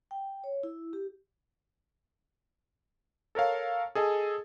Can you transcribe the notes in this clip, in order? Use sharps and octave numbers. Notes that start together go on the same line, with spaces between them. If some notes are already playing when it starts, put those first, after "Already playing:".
G5
C#5
E4
G4
A4 A#4 C#5 F5
G#4 A4 D#5 G#5